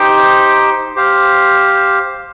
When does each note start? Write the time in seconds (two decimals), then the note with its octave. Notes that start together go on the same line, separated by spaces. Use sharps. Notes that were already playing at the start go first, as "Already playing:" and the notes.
Already playing: D#4 G4 C5 G5
0.96 G4 C5 F5